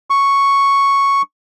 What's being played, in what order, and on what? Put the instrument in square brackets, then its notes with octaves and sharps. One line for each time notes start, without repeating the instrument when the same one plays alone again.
[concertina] C#6